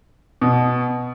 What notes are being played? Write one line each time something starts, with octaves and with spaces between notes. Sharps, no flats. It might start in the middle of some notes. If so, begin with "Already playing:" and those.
B2